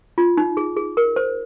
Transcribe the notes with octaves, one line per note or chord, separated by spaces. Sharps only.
F4
D#4
G#4
G#4
A#4
C5